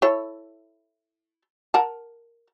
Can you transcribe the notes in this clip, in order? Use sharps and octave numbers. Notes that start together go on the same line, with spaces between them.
E4 A4 C#5
A#4 F#5 A5